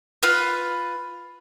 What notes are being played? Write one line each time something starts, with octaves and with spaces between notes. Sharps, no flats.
F4 B4